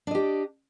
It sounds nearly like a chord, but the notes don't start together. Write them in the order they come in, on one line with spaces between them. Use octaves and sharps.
D4 D#5 G4